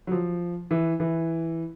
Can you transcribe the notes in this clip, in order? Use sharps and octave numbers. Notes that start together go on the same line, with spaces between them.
F#3
F3
E3
E3